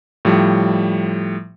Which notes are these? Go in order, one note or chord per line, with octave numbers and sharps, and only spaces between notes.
A2 F3 G3